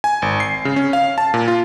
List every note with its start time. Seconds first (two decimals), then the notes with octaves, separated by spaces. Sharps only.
0.04 G#5
0.22 G#1
0.40 C7
0.65 C#3
0.76 C#4
0.93 F5
1.18 A5
1.34 A#2
1.48 F4